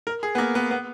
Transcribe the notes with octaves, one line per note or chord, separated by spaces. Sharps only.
A#4
G#4
B3
A#3
B3
B3